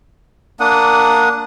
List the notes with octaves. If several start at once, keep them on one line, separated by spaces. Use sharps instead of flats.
A#3 D4 F#5 D#6